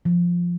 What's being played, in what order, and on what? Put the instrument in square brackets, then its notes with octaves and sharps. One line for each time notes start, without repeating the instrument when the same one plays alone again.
[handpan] F3